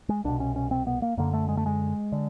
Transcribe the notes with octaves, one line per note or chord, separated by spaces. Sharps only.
G#3
C2 B2 D4
C#4
C#4
C4
B3
A#3
F#2 D3 A#3
A3
G#3
A3
G#3
D3